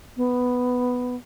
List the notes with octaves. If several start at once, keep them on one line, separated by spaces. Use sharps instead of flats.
B3